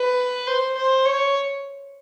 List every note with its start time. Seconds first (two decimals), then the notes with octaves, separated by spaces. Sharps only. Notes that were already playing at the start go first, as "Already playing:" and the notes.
Already playing: B4
0.47 C5
0.77 C5
1.06 C#5